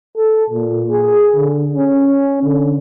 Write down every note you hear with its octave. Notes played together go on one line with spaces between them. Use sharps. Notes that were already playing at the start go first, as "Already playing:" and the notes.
A4
A#2
G#4
D3
C#4
D3